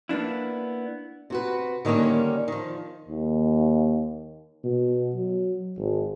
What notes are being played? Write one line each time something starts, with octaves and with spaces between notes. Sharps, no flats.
A#3 B3 D4 E4
C3 F#4 B4
D3 D#3 G3 A#3 C#4
D#3 F3
D#2
B2
F#3
G#1